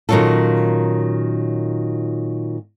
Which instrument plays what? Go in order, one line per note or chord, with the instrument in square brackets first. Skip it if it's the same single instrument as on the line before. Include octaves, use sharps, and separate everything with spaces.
[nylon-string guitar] A#2 D#3 F#3 C#4 F4 A4